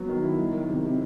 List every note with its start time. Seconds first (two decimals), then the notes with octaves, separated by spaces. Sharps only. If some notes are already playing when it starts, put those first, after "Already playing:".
Already playing: F#3 B3 F#4
0.09 D#3
0.23 E4
0.38 F#3
0.53 D#3
0.69 C3
0.84 C3